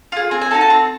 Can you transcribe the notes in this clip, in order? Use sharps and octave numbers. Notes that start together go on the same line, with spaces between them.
F4 G#4
C4 G#5
G#5
D#4 F#4 A4 A5
A5
C4